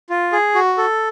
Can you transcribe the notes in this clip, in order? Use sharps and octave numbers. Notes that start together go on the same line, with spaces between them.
F4
G#4
F#4
A4